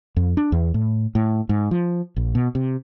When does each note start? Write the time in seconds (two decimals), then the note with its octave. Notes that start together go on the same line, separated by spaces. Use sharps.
0.16 F2
0.37 D4
0.52 E2
0.74 A2
1.15 A2
1.49 G#2
1.71 F3
2.16 A#1
2.35 B2
2.55 C3